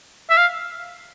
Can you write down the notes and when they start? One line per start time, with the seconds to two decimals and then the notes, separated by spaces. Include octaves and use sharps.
0.30 E5
0.37 F5